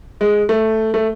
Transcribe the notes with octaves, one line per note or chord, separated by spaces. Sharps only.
G#3
A3
A3